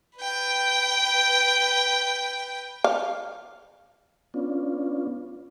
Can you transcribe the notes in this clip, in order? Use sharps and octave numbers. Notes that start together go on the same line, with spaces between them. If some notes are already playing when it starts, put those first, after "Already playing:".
B4 G5
F5
B3 C#4 D4 F4